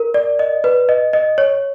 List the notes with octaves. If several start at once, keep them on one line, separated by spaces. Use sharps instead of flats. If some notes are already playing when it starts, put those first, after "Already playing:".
Already playing: A#4
D5
D#5
B4
D#5
D#5
C#5